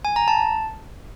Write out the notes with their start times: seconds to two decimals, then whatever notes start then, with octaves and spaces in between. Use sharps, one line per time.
0.05 G#5
0.16 A#5
0.28 A5